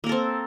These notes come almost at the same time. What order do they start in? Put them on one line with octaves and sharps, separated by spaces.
A#3 A#4 A4 C4